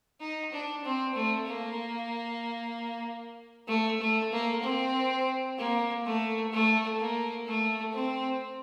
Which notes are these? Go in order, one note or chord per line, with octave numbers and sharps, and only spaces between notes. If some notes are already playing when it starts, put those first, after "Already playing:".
D#4
D4
C4
A3
A#3
A3
A3
A#3
C4
A#3
A3
A3
A#3
A3
C4